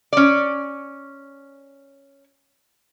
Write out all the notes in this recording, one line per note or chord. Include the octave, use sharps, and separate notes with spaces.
C#4 D5